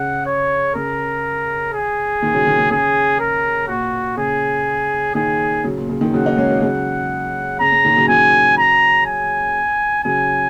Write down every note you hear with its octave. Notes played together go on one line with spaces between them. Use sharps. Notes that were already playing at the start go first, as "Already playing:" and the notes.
Already playing: C#3 F#5
C#5
C#3 A#4
G#4
A#2 D#3
C#3 F#3
A#2 D#3
C#3
C#3 G#4
A#4
A#2 F#4
C#3 G#4
A#2 D#3 G#4
C#3 F#3
A#2
C#3
A#2 D#3
C#3 F#3 F#5
A#3 D#4
G#3 C#4
F#3 A#3
C#3 F#3 F#5
C#3 A#5
C#3
A#2 D#3
C#3 F#3
C#3 F#3 G#5
A#5
G#5
C#3 F#3 G#5